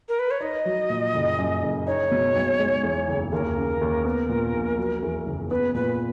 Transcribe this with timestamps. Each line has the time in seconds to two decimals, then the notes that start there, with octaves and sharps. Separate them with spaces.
0.09 A#4
0.19 B4
0.31 C#5
0.40 D#4 D#5
0.65 F#3
0.90 A#2
1.14 F#1
1.38 F#2
1.62 F#1
1.87 D#4 C#5
2.11 B2
2.36 B1
2.59 G#3
2.83 E2
3.08 F#1
3.32 D#2 A#4
3.57 C#3
3.81 D#2
4.05 B3
4.29 A#2
4.54 A#1
4.78 F#3
5.03 E2
5.26 F#1
5.50 B3 B4
5.74 A#2 B4